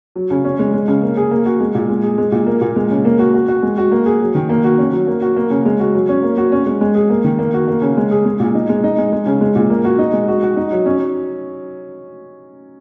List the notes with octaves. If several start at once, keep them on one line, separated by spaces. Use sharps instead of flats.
F#3
C#3
C#4
G#3
G#3
C#3
A#3
G#4
A#3
F#4
G#3
A#2
G#3
G#4
G#3
A#2
A#3
A#2
G#3
C#3
A#3
F#4
F#4
F#4
G#3
F#4
A#3
G#4
F#3
D#3
A#3
F#4
C#4
F#3
A#3
F#4
A#3
C#3
G#3
F#4
F#3
C#4
A#3
F#4
C#4
G#3
G#3
G#4
A#3
D#3
A#3
F#4
A#3
C#3
G#3
G#4
G#3
A#2
D#4
G#3
D#4
G#3
G#3
C#3
G#3
A#2
A#3
F#4
D#4
G#3
F#4
F#4
D#4
F#3
C#4